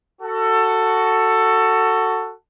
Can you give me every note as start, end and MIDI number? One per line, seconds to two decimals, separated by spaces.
0.22 2.32 66
0.22 2.32 69